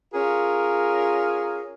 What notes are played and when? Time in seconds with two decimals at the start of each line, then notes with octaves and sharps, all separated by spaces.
0.14 C#4 F4 G#4 A#4